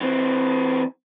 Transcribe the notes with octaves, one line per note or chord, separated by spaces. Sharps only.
E3 C4